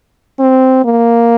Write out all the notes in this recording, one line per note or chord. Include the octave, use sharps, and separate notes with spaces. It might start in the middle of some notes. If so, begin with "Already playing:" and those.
C4
A#3